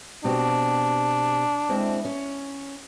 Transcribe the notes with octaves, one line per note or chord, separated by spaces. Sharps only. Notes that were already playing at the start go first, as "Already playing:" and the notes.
B2 C4 D4 G4
G#3 C4 E4
C#4